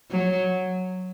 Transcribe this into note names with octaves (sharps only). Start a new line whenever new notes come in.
F#3